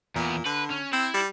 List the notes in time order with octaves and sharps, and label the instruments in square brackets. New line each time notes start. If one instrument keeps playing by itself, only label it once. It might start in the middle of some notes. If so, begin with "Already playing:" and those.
[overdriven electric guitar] E2 B3 [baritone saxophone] A#2
[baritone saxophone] D3 [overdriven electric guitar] B4
[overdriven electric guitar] C#4
[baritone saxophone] C4 [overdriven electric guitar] E4
[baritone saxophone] G3